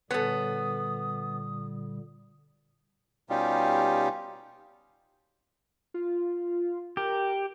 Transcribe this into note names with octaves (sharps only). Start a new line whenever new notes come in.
A#2 D3 G3 B3 A4 C#5 D#6
B2 G3 C#4 D#4 F4 G4
F4
G4 A#4